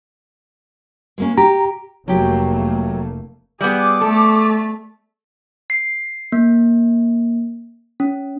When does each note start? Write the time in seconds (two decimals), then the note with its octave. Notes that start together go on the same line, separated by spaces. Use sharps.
1.18 G#3 A#3 C#4
1.38 G4 A#5
2.08 F1 F#3 A3 A#3 G4
3.61 G3 B3 G#4 D6
4.01 A3 A4
5.70 C7
6.32 A#3
8.00 C#4